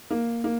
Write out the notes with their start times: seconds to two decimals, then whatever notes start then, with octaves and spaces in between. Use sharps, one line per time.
0.10 A#3
0.44 A#3